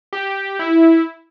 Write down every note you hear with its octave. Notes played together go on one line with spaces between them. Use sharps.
G4
E4